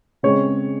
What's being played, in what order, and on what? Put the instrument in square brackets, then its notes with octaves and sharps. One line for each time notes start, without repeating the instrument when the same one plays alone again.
[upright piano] C#3 G#3 C4 C#5